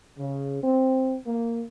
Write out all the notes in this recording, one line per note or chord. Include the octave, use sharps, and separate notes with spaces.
C#3
C4
A#3